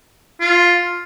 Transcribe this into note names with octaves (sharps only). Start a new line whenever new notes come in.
F4